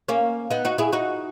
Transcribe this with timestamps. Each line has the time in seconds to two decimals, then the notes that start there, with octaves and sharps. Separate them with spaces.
0.08 A#3 C#4
0.50 B3 D#4
0.65 D#4 F#4
0.78 E4 G#4
0.93 D#4 F#4